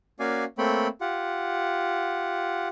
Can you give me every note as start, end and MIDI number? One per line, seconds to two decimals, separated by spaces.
0.20 0.45 58
0.20 0.45 61
0.20 0.45 66
0.20 0.45 74
0.20 0.45 77
0.20 0.45 80
0.58 0.87 57
0.58 0.87 58
0.58 0.87 60
0.58 0.87 73
0.58 0.87 79
0.58 0.87 83
1.01 2.68 65
1.01 2.68 67
1.01 2.68 78